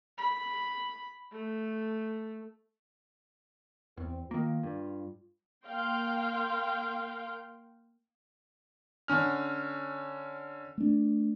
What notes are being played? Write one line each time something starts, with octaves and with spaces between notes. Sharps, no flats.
B5
A3
E2 C4
D#3 A#3 F4
G2
A#3 F5 G5 C6
D3 C#4 F6
A3 D4